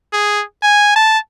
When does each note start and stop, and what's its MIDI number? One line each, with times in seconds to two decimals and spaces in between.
0.13 0.43 68
0.63 0.96 80
0.96 1.18 81